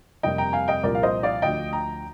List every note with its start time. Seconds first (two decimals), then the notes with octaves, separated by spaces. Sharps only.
0.23 F2 C3 G3 A#3 D#5 G5
0.38 G5 A#5
0.53 F5 G#5
0.68 D#5 G5
0.83 C2 A#2 F3 A#4 D5
0.95 F5
1.03 C5 D#5
1.23 D5 F5
1.42 D2 D3 F3 D#5 G5
1.73 G5 A#5